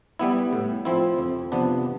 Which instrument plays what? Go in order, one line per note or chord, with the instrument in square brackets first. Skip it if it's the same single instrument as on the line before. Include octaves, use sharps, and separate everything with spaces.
[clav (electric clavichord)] G3 B3 E4
A2
F3 C4 E4
F2
C3 F3 B3 D4